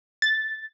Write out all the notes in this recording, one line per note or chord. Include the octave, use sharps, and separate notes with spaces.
A6